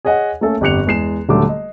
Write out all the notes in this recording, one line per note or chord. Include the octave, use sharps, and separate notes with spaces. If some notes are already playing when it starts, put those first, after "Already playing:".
G#4 C#5 D#5 F#5 G#5
A3 A#3 C#4 A4 E5
G1 F2 G4 F#6 C#7 F7
E2 G#3 C7 E7
D#1 D3 F#3 G3 A3 D6
D#5